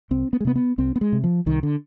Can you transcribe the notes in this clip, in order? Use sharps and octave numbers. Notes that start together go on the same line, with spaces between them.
C2 C4
B3
G#3
C3 B3
B3
C2 C4
B3
G#3
C3
F3
C2 D#3
D3